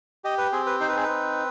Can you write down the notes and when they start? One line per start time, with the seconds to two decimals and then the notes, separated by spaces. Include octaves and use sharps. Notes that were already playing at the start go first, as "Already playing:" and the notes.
0.24 G4 D#5
0.38 B4
0.52 C4 G#4
0.66 B4
0.80 D#4 C5
0.88 B4
0.97 G#4
1.04 C4 B4